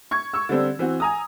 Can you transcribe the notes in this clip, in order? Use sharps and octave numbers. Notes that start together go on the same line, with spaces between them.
C#6 G#6
C#6 E6
D3 G3 C4 D4
E3 C4 F#4
G#5 A#5 D#6